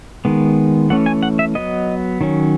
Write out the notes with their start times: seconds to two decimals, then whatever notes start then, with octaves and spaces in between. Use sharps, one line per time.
0.25 D#3 G#3 B3
0.90 E3 A3 C#4 F#5
1.06 G#5
1.23 F#5
1.39 E5
1.55 F#3 B3 D#5
2.21 D#3 F#3 C#4